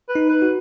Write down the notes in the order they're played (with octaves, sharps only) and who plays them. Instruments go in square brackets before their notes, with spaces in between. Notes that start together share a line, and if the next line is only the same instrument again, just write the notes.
[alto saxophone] B4
[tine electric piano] D#4
[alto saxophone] B4
[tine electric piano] F#4